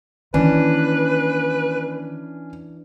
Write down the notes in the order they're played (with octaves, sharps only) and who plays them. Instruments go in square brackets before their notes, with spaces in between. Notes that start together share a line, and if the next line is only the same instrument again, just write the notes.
[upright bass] D#3 A#3 [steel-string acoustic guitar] E3 D4 [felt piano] C#4 [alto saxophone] B4